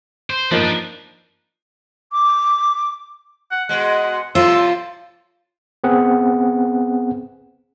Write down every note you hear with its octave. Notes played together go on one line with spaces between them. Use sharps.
C5
F3 A#3 D4 D#4 B4
D6
F#5
B2 G#3 F#5
A2 C3 F3 F4 E6
B3 C4 G#4 F#5